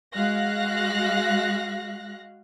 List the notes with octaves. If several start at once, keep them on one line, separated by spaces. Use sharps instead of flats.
G#3 F#4 F5 F#6 A#6